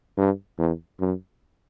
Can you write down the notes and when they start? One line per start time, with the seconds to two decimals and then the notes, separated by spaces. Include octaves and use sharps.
0.17 G2
0.59 E2
1.00 F#2